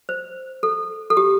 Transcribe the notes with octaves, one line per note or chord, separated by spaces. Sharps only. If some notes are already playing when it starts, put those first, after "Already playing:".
C5
A4
A4
G4